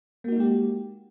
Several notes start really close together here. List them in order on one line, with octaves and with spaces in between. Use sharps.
A#3 F#4 D#4 G#3 G4